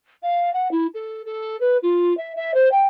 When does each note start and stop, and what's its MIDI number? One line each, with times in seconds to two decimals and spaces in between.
0.22 0.52 77
0.53 0.70 78
0.71 0.87 64
0.94 1.22 69
1.25 1.59 69
1.60 1.77 71
1.82 2.15 65
2.17 2.33 76
2.36 2.52 76
2.54 2.69 72
2.71 2.86 79